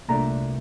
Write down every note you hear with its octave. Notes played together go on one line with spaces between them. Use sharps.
C2 A#2 A3 D4 A#5